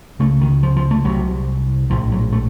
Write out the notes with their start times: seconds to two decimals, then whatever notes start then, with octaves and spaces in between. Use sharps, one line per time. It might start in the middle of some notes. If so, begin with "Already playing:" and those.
0.19 C#2 C#3 A3
0.41 D#3
0.63 F3
0.76 F3
0.91 A3
1.05 C2 C3 F#3
1.90 A#1 A2 F3
2.12 F#3
2.32 A3